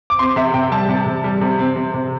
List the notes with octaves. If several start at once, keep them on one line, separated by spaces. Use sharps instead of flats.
D6
C4 C6
C3 E5
C3 G5
G3 A5
C3
C3
G3
C3
C4
C3
C3